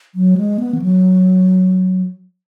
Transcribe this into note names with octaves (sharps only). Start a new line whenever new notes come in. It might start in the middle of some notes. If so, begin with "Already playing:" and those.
F#3
G#3
B3
E3
F#3